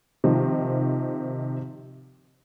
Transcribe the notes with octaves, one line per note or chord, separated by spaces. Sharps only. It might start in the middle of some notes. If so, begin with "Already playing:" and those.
C3 D#3 F3